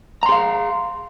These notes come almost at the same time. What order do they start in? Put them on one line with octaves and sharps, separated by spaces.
A#5 C6 G#4 F5